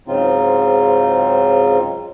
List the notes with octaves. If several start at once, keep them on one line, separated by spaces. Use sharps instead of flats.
G#2 C#3 F#3 C4 D#4 F4